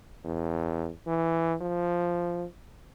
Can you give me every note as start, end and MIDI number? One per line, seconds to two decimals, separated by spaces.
0.25 0.90 40
1.07 1.55 52
1.61 2.45 53